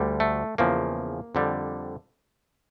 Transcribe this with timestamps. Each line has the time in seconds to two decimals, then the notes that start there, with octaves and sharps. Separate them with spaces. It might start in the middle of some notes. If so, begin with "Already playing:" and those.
Already playing: D2 D3 G3
0.20 A3
0.58 E2 C#3 F3 A#3
1.35 F2 D3 G3